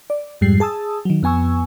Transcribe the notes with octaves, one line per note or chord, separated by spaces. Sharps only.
D5
F2 G#2 G3 C7
G#4 A5 D#6 E6
D#3 F#3
F2 B3 G#5 C#6 E6